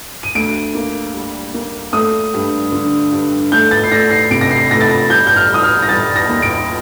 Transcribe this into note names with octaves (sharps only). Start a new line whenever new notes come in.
D#7
D2 D7
A#3
G3
A#3
A3 D#6
G2
D3
G2
A3 G6
A6
C7
A3 A#6
C7
C3 D7
A#6
C7
A3 A#6
A6
A#6
G3 G6
G6
F6
G3 D#6
F6
A#6
G3 A6
A#6
D#2
D7